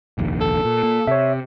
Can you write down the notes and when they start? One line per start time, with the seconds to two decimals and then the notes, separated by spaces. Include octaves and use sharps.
0.18 F1 A#1 D#2
0.41 A4
0.65 A#2
0.83 A#2
1.07 C3 C#5 E5